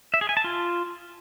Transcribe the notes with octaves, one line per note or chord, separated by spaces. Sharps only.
E5
G#4
G#5
A5
F4